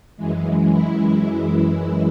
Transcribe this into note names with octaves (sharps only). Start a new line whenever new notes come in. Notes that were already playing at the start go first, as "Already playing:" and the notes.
F#2 E3 G#3
E4
E4